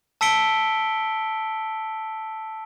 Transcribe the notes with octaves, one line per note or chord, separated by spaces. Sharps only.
A5 E6 B6 C#7 D7 G7